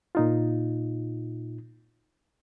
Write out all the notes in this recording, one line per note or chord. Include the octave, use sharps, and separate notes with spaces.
A#2 D#4 F4